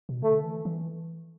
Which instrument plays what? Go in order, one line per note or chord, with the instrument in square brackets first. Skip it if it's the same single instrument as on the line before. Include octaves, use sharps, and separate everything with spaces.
[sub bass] B2
[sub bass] D3 [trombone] A3
[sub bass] E3
E3